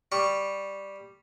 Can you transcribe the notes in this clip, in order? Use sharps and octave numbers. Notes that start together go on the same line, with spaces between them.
G3 C#6